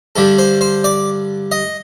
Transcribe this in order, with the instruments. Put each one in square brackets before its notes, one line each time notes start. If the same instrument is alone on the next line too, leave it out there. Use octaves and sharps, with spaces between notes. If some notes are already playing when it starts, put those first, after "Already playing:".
[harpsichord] G2 D3 G3 A4
C5
C5
D5
D#5